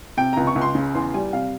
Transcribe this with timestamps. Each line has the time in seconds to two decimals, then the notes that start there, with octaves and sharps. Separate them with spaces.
0.17 C3 G5
0.33 C#2 A#5
0.47 C#6
0.56 C#2
0.61 C6
0.75 C#3
0.94 E2 C6
1.14 G3 G#5
1.33 C3 F5